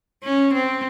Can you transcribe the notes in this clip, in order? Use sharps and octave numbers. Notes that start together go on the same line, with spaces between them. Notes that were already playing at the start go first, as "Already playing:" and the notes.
C#4
C4